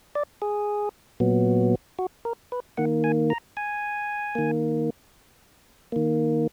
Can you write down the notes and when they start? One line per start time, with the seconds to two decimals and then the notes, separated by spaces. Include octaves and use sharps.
0.15 D5
0.42 G#4
1.20 A#2 F#3 B3
1.99 F#4
2.25 A#4
2.52 B4
2.77 D#3 A#3 F#5
3.04 G#5
3.30 A#5
3.57 G#5
4.35 D#3 A#3
5.92 D#3 A#3